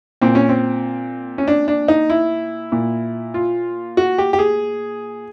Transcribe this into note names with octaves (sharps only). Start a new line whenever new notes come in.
A#2 C4
C#4
C4
C#4
D4
D4
D#4
E4
A#2
F4
F#4
G4
G4
G#4